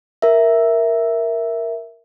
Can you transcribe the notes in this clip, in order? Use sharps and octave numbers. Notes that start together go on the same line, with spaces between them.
A#4 E5